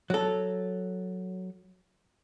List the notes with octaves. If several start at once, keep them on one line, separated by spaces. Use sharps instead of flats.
F#3 A4